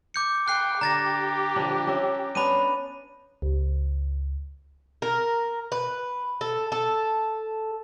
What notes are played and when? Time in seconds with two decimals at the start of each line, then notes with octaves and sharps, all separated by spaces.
0.14 D6 G6 C#7
0.48 G5 F#6 C7
0.81 D3 G4 A#5 A6 A#6
1.56 D3 F3 D4
1.87 C#4 D#5 E5
2.35 B3 C#4 D4 B5 D#7
3.42 C#2
5.02 A#4
5.72 B4
6.41 A4
6.72 A4